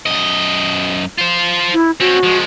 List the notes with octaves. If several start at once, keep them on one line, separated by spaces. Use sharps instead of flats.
F#2 D#5
F4 C5
E4
C4 C#4 F#4
F3 G#3